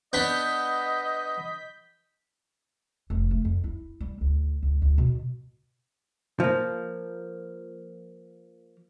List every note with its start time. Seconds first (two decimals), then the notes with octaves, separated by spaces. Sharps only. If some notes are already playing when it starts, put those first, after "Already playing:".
0.13 B3 D4 D#5 G6 B6
3.10 F1
3.31 A3
3.45 F2
3.64 E4
4.01 G3
4.21 D2
4.62 D2
4.82 D2
4.98 B2
6.40 F3 A#3